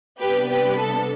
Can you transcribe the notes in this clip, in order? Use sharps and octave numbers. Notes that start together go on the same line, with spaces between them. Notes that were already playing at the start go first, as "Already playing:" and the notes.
C3 G3 B3 D4 G4 B4
G4 B4
A4